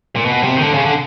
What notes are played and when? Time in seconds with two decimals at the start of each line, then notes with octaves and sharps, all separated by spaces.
0.16 A#2
0.25 B2
0.43 C3
0.57 D#3
0.61 D3
0.74 C#3
0.85 D3